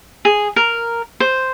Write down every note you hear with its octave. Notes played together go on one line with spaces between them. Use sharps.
G#4
A#4
C5